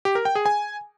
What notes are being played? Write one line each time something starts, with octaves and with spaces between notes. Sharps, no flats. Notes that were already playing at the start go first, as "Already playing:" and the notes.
G4
A#4
G5
G#4
G#5